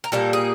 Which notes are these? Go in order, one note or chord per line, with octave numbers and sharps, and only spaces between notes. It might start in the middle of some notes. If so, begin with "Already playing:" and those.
A#4
A#2 G3 A#3 A4
G#4